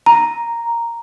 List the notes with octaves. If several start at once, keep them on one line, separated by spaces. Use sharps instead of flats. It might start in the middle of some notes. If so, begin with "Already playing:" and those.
A#5